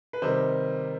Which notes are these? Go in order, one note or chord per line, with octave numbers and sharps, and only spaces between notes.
B4
C3 D#3 G3 C5